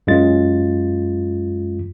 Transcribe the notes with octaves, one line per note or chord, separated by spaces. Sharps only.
F#2 G#3 F4 A6